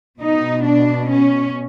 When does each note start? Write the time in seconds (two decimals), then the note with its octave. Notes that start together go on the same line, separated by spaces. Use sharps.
0.21 B2 D#4
0.65 D4
1.08 C#4